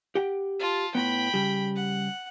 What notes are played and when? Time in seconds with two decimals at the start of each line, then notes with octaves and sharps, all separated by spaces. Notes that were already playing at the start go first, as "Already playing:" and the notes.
0.15 G4 F#5 G5
0.60 F4 A5
0.95 A2 B3 G5 B5
1.34 C#3 G3 G4
1.76 F#5